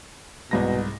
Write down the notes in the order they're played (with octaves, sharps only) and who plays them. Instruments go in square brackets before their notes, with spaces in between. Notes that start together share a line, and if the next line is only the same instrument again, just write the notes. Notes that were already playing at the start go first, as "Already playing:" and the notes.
[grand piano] C2 G#2 A#6 [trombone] B2